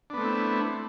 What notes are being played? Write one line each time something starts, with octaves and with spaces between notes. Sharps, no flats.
A3 B3 C4 D4 E4